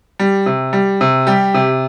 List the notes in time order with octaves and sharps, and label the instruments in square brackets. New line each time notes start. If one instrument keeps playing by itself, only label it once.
[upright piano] G3
C3
G3
C3
G3 G4
C3